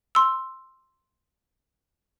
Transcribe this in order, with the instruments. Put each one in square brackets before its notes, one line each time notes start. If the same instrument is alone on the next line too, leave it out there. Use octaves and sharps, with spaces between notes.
[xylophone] C6 E6